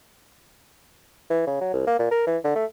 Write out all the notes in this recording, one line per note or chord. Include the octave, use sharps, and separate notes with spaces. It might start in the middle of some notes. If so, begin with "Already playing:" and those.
E3
C#3
F#3
C2
A#3
A#2
A#4
E3
D3
A3